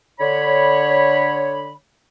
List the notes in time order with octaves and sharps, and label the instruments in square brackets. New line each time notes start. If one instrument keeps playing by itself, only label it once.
[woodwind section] D3 C#5 B5